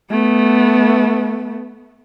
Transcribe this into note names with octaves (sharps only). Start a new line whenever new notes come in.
A3 B3